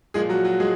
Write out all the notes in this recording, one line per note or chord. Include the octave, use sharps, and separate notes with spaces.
A#2 F3 G#3 G#4
F#3 F#4
F#3 F#4
G#3 G#4